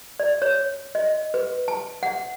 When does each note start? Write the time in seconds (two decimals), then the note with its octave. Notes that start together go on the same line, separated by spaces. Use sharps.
0.20 D5
0.42 C#5
0.95 D#5
1.34 B4
1.68 A5
2.03 F#5